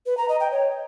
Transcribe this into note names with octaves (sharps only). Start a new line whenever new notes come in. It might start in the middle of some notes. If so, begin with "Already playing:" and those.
B4
A#5
D#5
G5
C#5